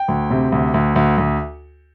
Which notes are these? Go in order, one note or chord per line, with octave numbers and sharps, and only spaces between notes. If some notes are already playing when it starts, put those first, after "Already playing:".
Already playing: G5
D2
C3
D2
D2
D2
D2